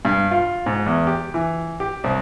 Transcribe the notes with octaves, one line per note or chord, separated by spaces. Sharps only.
G2
F4
G#2
E2
G4
E3
G4
C2